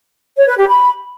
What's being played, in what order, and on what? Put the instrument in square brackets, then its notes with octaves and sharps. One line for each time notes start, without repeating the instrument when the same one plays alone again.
[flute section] C#5
B4
G4
B5